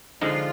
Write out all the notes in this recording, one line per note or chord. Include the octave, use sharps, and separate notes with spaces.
D3 F3 G#3 D#4 F4